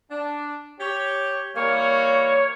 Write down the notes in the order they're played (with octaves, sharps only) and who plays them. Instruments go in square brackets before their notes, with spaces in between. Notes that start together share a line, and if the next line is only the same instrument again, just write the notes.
[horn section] D4
G4 C#5
[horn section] E3 G3 A#3 [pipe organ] C#5